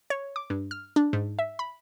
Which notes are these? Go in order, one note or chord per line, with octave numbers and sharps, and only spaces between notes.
C#5
D6
G2
F6
D4
G#2
E5
B5